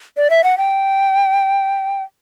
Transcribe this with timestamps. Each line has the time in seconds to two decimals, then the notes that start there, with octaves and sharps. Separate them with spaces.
0.17 D5
0.30 E5
0.44 F#5
0.58 G5